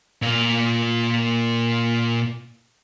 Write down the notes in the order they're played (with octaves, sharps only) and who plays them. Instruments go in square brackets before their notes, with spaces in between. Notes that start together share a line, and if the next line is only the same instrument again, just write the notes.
[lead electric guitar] A#2 F4